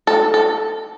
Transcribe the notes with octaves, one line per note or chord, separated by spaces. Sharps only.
A4
A4